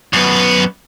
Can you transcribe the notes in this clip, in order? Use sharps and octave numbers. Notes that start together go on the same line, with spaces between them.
F#2 B3